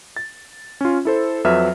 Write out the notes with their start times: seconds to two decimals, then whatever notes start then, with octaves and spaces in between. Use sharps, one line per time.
0.16 A6
0.81 C#4 F4
1.05 E4 A4 C5
1.44 F2 F#3 B4 E5 F6